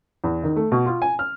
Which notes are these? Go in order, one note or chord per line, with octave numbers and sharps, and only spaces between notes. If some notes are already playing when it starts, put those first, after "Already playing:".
E2
D#3
A3
B2
F4
G#5
F6